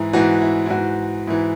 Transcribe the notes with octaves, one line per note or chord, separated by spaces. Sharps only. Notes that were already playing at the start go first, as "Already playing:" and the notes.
Already playing: G#2 E3 E4
G#2 E3 F#4
E4
E4
G#2 E3 F#4
G#2 E3 E4